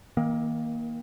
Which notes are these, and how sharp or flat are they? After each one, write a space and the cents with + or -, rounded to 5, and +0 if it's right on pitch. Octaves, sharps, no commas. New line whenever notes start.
D#3 +35 A#3 +10